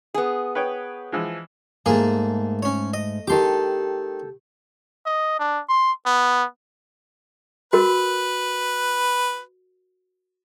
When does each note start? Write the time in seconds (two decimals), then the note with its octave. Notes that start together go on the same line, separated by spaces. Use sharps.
0.14 B3 G#4
0.55 B4 C#5 G5
1.12 E3 F3 G#3
1.86 G#2 A3 A#3 G#4 G#5
2.63 C#4 C#5
2.94 D#5
3.27 D#3 G4 A4 C6 D6
5.06 D#5
5.40 D4
5.69 C6
6.06 B3
7.73 F#4 A#4 B4